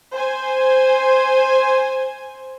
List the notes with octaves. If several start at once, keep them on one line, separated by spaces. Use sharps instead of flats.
C5 G#5